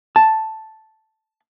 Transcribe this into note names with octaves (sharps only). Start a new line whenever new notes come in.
A5